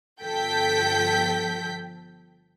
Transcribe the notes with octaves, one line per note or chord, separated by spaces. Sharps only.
G1 F3 A4 G5 G6 B6